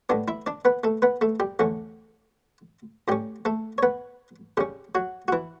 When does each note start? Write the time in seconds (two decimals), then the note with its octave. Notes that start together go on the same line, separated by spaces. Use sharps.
0.09 A2 G3 B3 D4 D5
0.28 E4 E5
0.46 D4 D5
0.65 B3 B4
0.84 A3 A4
1.02 B3 B4
1.21 A3 A4
1.40 G3 G4
1.59 E2 D3 A3 C#4
3.08 A2 G3 C#4 G4
3.45 A3 A4
3.78 C#5
3.83 B3 B4
4.57 C#3 G3 C#4 G4
4.95 F#3 F#4
5.28 F#4
5.32 E3 E4